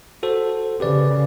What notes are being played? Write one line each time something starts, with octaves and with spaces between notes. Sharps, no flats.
F#4 A4 C5
C#3 G4 B4 D5